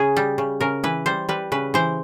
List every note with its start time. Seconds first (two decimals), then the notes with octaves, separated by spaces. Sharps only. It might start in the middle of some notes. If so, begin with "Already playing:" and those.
Already playing: C#3 G#4
0.16 G3
0.38 C#3
0.61 C#3 A#4
0.84 E3 B4
1.06 G3 C5
1.29 G3 B4
1.52 C#3 B4
1.74 E3 C5